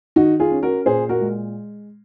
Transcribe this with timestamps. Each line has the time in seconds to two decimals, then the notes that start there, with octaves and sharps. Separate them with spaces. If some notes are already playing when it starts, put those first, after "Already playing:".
0.16 D#3 D#4 F#4
0.40 F4 G#4
0.51 C#4
0.63 F#4 A#4
0.86 A#2 G#4 C5
1.09 F#4 A#4
1.20 G#3